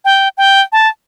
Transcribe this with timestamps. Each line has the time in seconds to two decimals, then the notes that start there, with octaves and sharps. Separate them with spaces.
0.05 G5
0.38 G5
0.72 A5